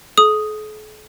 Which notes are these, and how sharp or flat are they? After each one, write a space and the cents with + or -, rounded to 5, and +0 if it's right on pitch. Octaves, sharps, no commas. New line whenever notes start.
A4 -45 D#6 +0